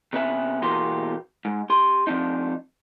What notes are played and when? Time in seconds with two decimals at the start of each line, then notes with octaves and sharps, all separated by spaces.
0.13 C3 B3 C#4 B4 E5
0.62 E2 B2 A#3 G4 C6
1.45 G#2
1.70 G4 C6
2.07 F3 C4 D4 D#4